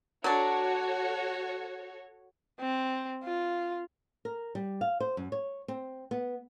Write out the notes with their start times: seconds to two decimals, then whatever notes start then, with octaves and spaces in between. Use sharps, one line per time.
0.24 F#3 D4 F#4 A4 C#5
2.60 C4
3.24 F4
4.25 A#4
4.55 G3
4.81 F5
5.00 C5
5.17 F#2
5.32 C#5
5.68 C4
6.11 B3